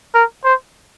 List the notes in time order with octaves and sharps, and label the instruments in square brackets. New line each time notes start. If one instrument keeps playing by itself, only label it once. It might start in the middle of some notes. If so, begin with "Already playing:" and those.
[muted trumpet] A#4
C5